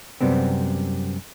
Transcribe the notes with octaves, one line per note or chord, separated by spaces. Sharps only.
F#2 C3 G3 B3 C4